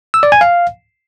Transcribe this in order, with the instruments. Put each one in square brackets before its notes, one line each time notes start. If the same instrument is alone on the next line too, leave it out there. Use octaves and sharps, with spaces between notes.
[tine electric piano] E6
D5
G#5
F5